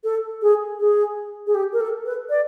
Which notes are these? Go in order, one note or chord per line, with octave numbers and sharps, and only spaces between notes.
A4
G#4
G#4
G#4
G4
A#4
A4
B4
D5